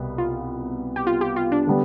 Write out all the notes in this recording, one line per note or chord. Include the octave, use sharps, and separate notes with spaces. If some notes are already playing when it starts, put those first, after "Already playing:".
Already playing: C2 B2 B3
F4
G4
F4
G4
F4
D4
D3 G3 B3